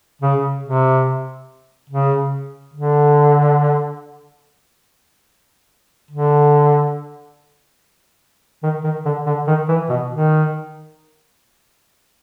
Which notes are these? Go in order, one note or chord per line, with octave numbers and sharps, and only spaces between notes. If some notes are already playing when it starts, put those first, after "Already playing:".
C#3
C3
C#3
D3
D3
D#3
D#3
D3
D3
D#3
E3
B2
D#3